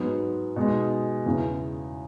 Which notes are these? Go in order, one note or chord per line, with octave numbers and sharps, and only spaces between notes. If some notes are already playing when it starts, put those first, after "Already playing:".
Already playing: G#2 F#3 B3
B2 G#3 D#4
E2 C#3 E3